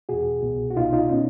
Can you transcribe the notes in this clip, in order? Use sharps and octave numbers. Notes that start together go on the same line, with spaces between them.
E2 B2 F#4 G#4
C2 B2
F#4
C2 B2 D#4 F4
D#4 F4
B2 C#4 D#4